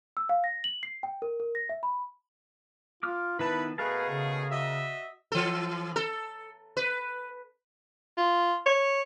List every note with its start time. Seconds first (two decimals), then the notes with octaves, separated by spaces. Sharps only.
0.17 E6
0.29 F5
0.44 A#6
0.64 F#7
0.83 C7
1.03 G5
1.22 A#4
1.40 A#4
1.55 A#6
1.69 E5
1.83 B5
3.03 F4 D6 F6
3.39 D#3 B3 E4 B4 A5
3.78 B2 A3 G#4 A#4 B4 F5 A5
4.09 C#3
4.51 F#4 D#5 E5
5.32 E3 A4
5.96 A4
6.77 B4
8.17 F4
8.66 C#5